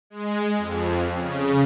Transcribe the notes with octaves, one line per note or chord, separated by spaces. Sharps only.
G#3
F2
C#3